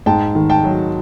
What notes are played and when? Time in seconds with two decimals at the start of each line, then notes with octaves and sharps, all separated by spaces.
0.06 G#2 G5 A5
0.35 D#3
0.50 G5 A5
0.64 F#3